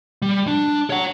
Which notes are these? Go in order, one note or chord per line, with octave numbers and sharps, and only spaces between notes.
G3
D4
C#5 F#5